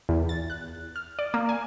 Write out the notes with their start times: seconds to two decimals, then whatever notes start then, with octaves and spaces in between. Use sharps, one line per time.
0.09 E2
0.29 A6
0.50 F#6
0.96 F6
1.19 D5
1.34 A#3
1.49 G#5